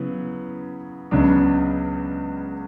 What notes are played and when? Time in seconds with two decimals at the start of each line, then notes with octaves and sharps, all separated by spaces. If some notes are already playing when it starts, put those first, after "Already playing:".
Already playing: C#3 F#3 B3 E4
1.11 C#2 C#3 F#3 B3 D4